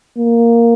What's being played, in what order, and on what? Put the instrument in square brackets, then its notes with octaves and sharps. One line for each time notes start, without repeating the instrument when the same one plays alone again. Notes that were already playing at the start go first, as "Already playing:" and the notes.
[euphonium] A#3